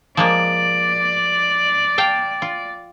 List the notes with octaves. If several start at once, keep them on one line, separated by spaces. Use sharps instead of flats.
F3 G#3 A#3 D5
F5 G5 A5
F4